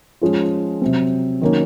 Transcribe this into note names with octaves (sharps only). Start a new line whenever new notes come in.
F3 G#3 C#4 F4
C3 F#3 C4
D#3 F#3 A#3 C#4